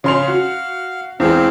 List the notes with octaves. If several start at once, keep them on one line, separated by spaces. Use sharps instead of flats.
C#3 F5 C6 F7
F#4
E2 G#3 C4 F5